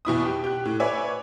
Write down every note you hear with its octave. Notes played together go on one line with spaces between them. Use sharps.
E2 B2 E4 D#6
G4
G4 F#6
A2
B4 C#5 D5 E5 G#5